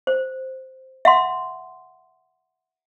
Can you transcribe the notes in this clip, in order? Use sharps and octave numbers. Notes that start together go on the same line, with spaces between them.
C5
E5 F#5 C6